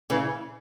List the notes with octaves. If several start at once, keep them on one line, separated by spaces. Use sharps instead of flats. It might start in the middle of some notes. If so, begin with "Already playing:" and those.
C#3 E3